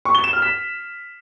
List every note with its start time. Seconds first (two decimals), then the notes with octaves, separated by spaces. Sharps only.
0.05 C#6
0.15 G7
0.24 E7
0.33 F6
0.42 B6